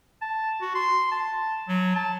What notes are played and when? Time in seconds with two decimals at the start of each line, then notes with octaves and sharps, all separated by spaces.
0.22 A5
0.61 F#4
0.75 C6
1.12 A5
1.68 F#3
1.96 A5